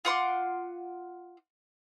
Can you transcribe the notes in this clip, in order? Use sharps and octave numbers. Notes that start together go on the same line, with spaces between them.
F4 F#5 C6 D6